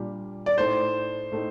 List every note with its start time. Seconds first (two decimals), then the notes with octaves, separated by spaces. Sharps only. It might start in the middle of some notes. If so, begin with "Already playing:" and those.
Already playing: A#2 G3 D4 G4
0.46 D5
0.58 A2 A3 D#4 C5
1.32 A2 A3 D#4